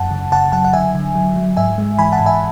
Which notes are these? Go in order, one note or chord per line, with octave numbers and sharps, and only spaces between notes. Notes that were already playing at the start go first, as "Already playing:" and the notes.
Already playing: F#2 F#5 A5
C#3
C#3 F#5 A5
F#3 F#5 A5
F#5
D3 E5 G#5
D3
F#3
F#3
G#2 E5 G#5
G#3
E3 G#5 B5
F#5 A5
G#2
E5 G#5